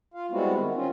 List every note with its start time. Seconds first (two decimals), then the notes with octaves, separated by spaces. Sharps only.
0.14 F4 F5
0.31 G3 G#3 B3 C4 E4 F#4
0.55 D#3
0.74 C4 C#4 F4